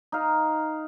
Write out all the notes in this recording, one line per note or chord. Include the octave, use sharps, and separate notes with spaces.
D#4 F5